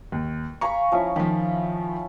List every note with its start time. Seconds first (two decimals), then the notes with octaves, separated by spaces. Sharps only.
0.12 D#2
0.61 F5 G#5 A#5 B5 C#6
0.92 F3 C#4 E4
1.16 D#3 F3 B5